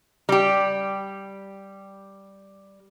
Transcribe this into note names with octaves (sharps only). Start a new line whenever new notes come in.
G3 G4